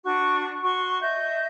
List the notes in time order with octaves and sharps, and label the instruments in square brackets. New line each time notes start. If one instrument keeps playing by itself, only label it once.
[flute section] D4 F#4 C#6
F#4 C6 C#6
D#5 E5 G6